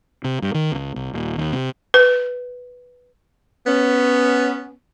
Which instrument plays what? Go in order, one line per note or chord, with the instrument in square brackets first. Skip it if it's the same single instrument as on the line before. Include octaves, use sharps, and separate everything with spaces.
[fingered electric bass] C3
G2
D#3
C#2
C2
D#1
D#2
C3
[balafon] B4
[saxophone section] B3 C#4